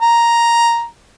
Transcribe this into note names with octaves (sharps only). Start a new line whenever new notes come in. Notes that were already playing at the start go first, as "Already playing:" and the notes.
A#5